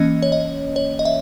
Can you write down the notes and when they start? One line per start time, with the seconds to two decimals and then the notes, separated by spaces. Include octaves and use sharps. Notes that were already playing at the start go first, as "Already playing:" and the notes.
Already playing: E3 A#3 C#4 D#5
0.22 C#5
0.32 D#5
0.76 C#5
0.99 D#5
1.05 E5